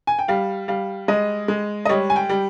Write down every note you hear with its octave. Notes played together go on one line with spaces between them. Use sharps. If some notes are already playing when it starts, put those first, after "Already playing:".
G#5
G5
G3 F5
G3 F5
G#3 D#5
G#3
D#5
G3 C#5
G#5
G5
G3